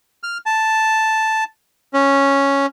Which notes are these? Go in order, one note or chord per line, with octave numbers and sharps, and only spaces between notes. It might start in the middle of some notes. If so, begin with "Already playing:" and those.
F6
A5
C#4